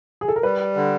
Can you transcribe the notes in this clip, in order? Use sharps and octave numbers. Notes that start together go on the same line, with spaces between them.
G#4
A4
A#4
G3 B4
D3